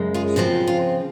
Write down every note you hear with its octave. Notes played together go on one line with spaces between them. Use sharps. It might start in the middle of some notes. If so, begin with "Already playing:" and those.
Already playing: F#2 C#3 G#3
F4 G#4
C#3 F3 C4 F#4
F4